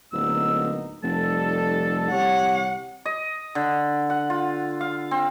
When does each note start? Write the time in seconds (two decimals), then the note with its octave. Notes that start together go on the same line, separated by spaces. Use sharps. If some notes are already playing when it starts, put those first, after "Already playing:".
0.13 D1 A#3 B3 D#4 E6
1.04 F1 G3 D#4 A4 A5
2.11 C2 G4 C#5 F#5
3.05 D#5
3.55 D3
4.10 F#5
4.30 F4
4.81 F5
5.11 C4